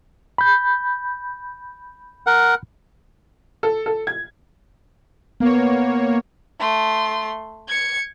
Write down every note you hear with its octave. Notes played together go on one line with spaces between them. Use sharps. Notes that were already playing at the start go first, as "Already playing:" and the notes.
B5 G6
A#4 F#5
A4
A4
G#6
A#3 B3 C#5
A3 C6
G#6 C#7